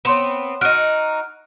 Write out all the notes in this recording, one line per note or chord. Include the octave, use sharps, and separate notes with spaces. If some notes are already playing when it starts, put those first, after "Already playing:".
B3 C4 C#5 C6 E7
D#4 F#4 F6 F#6 D7